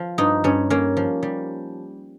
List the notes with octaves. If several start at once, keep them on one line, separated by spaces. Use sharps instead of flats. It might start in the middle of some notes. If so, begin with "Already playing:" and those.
Already playing: F3
G2 D#4
G2 C#4
A#3 C#4
F3
G3